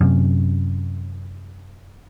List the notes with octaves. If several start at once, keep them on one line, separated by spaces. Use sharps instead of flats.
F#2 C3